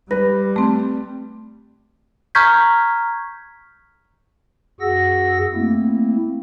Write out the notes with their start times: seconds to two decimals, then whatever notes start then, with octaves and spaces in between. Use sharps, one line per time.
0.11 G3 B4 A#6
0.56 A3 C4
2.35 A#5 C#6 F6 G6 G#6 B6
4.81 F#2 F#4 G#4 F#5 E6 A#6
5.54 A3 A#3 C4 E4